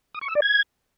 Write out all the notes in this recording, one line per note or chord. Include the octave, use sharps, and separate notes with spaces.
D#6
C#6
E6
D5
G#6